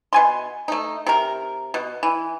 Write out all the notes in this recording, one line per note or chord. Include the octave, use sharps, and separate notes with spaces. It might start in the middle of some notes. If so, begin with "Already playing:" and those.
B2 G#5 C6
A3 D#4
C3 A#4
B2
E3